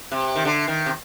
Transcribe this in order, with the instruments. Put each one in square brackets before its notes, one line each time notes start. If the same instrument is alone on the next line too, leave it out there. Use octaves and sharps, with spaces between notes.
[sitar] C3
D#3
D3
D#3
C3